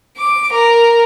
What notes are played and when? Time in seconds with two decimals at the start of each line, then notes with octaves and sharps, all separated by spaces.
0.18 D6
0.53 A#4